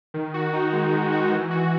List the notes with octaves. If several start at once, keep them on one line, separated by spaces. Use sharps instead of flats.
D#3
F#4
D#4
G#3
D#3
F#4
E3
F#4